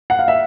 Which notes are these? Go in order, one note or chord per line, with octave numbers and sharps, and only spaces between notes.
F#5
F5
E5